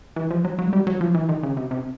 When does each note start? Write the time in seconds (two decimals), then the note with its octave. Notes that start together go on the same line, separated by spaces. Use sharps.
0.16 E3
0.31 F3
0.45 F#3
0.59 F#3
0.67 G#3
0.73 G3
0.87 F#3
1.01 F3
1.14 E3
1.29 D#3
1.43 C#3
1.57 C3
1.71 C3